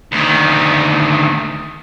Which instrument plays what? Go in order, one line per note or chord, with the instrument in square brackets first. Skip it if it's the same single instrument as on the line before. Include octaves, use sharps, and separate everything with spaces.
[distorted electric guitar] D2 D#3